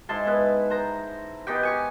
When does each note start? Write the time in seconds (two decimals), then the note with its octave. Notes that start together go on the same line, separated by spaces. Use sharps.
0.09 G#2 E4 A5 C6
0.26 B3 E4 B4
0.70 C5 A#5
1.47 B3 D#4 G4 G5
1.63 G#5 C#6 D6